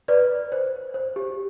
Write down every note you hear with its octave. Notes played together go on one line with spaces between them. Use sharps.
B4 D5
C5
C5
G4